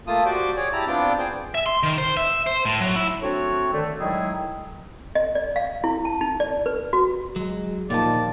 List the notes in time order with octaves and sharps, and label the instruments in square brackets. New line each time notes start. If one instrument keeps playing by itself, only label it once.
[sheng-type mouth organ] A3 A#3 F4 A5 D#6
F#4 G4 C5 D5 G5
G#4 C#5 D5
E4 G4 A5 A#5
B3 C4 D4 F4 D5 G5
G#4 C5 G5
[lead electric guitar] E5
C6
D#3
C5
E5
C5
A2
F#3
E4
[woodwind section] A3 C4 D4 F#4 C#5
D3 D#3 A3
A2 D#3 F#3 G#3 E4 G#4
[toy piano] D#5
D5
F5
E4
A5
D#4
D5
B4
F#4
[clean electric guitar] F#3 [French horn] G#3
[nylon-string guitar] D#2 F3 A5 [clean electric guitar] A#2 [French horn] D#3 [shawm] D5